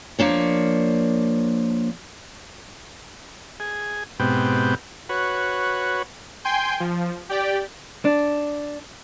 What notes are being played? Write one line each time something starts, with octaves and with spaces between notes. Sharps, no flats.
F3 A#3 D4 C#5
G#4
G#2 B2 B3 C4 G4
F#4 B4 C#5
G5 G#5 C6 G6
F3
G4 D5 G5
D4